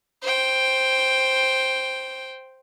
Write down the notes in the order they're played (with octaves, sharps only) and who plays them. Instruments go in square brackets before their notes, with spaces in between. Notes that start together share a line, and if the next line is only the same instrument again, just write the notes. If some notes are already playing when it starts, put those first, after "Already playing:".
[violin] C5 G5